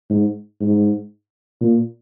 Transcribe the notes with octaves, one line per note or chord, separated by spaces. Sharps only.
G#2
G#2
A#2